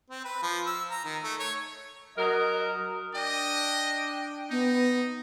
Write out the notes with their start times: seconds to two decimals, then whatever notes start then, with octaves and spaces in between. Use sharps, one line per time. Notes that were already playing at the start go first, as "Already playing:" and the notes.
0.10 C4
0.25 B4
0.43 F3
0.66 E6
0.90 A#5
1.05 D#3
1.24 A3
1.40 C#5
2.17 F#3 A#4 D#5
3.15 D4 D#5 G5
4.50 B3 D#4